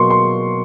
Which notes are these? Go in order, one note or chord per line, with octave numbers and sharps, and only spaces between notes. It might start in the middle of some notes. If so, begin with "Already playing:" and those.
Already playing: B2 F#3 A#3 C6 C#6
C6